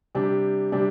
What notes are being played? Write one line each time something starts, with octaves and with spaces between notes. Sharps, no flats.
C3 G3 D4 G4
C3 G3 D4 G4